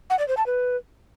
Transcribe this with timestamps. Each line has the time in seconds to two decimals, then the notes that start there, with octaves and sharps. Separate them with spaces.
0.10 F#5
0.19 D5
0.28 C5
0.37 A5
0.46 B4